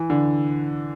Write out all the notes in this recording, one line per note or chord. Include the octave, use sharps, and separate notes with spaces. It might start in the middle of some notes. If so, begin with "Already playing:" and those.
Already playing: E3
D3